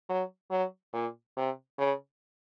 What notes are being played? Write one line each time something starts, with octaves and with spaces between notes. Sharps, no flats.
F#3
F#3
A#2
C3
C#3